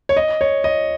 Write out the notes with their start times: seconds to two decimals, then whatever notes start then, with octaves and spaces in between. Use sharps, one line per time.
0.09 C#5
0.17 D#5
0.41 C#5
0.64 D#5